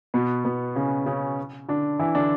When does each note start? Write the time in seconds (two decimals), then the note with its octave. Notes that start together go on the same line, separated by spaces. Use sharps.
0.14 B2 B3
0.45 B2 B3
0.75 C#3 C#4
1.06 C#3 C#4
1.69 D3 D4
1.99 E3 E4
2.15 D3 D4